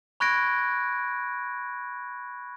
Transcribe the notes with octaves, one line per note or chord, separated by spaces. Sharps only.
B5 C#6 F#6 G#6 A#6 D7